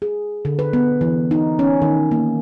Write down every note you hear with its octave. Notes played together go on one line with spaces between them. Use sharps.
G#4
D3
B4
B3
E3
D#4
C#4
D#3
A#3